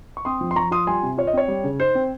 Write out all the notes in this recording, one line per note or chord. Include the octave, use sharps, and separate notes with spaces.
C#6
C4 C6 D#6
F3
C6
F3 A#5 C#6
F4 C6 D#6
G3 G#5 C6
C3
F4 C#5
D#5
C4 C#5
G3
C#3
D#4 C5
C4